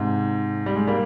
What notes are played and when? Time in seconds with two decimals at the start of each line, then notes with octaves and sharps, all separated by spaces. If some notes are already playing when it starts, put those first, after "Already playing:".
Already playing: G#2 C3
0.66 G3
0.76 G#3
0.87 G3 A#3